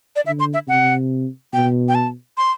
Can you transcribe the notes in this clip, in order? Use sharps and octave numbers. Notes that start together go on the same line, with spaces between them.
D5
D3 E5
C6
E5
C3 F#5
B2 G5
G5
A5
C6